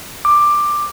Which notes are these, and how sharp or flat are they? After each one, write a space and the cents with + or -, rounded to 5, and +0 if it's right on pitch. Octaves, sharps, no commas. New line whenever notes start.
D6 +10